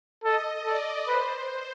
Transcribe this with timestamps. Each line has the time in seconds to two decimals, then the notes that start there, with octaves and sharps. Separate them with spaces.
0.24 A4 D#5
0.65 A4 D5
1.07 B4 C5